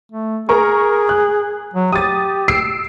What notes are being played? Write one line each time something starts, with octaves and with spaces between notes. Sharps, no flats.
A3
G#4 A#4 A#5 C#6
F#6
F#3
G4 D#6 A6
E6 C7 D7